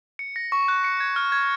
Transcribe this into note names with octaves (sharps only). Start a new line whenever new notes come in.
C#7
A#6
C#6
F#6
C#7
G#6
F6
G#6